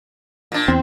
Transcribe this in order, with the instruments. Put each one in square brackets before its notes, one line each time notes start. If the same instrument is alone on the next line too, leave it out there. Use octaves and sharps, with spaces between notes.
[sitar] A#2 D4
[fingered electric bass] E2 [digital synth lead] C4